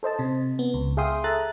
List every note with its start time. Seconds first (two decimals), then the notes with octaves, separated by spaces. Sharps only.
0.03 A4 C5 D#5 A5
0.19 C3
0.59 B3
0.74 C#2
0.97 G#4 E5 F5 G5 C6 D#6
1.24 A4 E5 A#5 F#6 A6